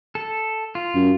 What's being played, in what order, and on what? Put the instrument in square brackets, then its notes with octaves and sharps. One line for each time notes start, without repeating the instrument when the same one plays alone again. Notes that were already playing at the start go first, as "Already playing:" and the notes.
[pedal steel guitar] A4
F4
[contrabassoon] F#2